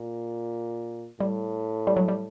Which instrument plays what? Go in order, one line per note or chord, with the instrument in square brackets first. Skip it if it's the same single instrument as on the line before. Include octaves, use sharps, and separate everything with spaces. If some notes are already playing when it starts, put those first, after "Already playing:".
Already playing: [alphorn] A#2
[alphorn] A2 [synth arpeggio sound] G3
[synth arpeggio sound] G3
F#3
G3